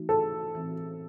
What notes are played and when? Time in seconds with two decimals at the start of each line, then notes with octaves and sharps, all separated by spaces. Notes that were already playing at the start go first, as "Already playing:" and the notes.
Already playing: E3 A3 D#4 F#4
0.09 A4
0.55 A2 E3 C4